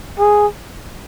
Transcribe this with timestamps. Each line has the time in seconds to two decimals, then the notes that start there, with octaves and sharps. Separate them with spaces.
0.19 G#4